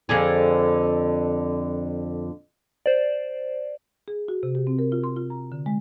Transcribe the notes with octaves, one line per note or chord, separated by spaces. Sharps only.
F2 D3 G#4
C5 D5
G#4
F#4
C3
G4
C4
A#4
F4
C6
F4
A#5
D3
G#3